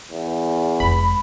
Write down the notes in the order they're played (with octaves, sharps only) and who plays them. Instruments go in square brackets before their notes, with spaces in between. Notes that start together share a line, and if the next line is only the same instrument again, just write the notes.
[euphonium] E2
[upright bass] F1 G#3 [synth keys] B5